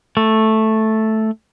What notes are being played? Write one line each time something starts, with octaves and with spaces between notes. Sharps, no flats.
A3